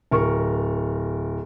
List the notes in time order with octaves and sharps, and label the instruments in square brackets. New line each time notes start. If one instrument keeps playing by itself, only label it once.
[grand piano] D1 A#4 C#6